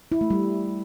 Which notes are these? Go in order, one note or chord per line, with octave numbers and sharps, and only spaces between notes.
E4
A3
G3